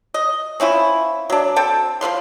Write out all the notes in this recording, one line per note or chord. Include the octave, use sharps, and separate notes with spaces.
D#5
C4 C#4 E4 F4
F#3 D4
C4 A4 G5 A5
F3 B4 F5 C6